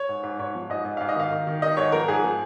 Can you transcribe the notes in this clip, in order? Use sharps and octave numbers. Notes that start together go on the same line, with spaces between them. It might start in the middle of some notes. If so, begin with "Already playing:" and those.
Already playing: C#5
G#2
G#2
G#2 C#5
F3
G#2 D#5
G#2
G#2 F5
D#5
D#3 F5
D#3
D#3
D#3 D#5
G#2 C#5
F3 A#4
G#2 G#4
F3